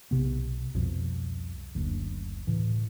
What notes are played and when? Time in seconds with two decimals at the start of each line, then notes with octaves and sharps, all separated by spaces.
0.11 B1 C3 B3
0.75 C2 F2 B2 F3
1.75 F#1 D2
2.47 A2 C#3 E3